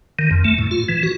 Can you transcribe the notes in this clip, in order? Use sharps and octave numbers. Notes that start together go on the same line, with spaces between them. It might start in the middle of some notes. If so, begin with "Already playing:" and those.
D#3
F2
A3
A2
F4
E3
F#4